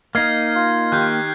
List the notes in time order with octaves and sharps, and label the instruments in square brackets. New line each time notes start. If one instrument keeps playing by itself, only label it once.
[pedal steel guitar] A#3 D#4 [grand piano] D#5 [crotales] F6 G#6 C7
[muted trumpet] F4
[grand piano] D#3 G4 [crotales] F#6 G6